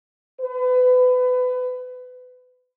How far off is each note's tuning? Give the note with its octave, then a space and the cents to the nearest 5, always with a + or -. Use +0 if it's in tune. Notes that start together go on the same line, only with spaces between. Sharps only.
B4 +30